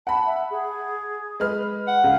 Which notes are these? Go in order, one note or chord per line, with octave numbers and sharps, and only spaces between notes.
F#5 A5 B5
E5
G#4
G#3 B4 F6
F#5
C#2 F5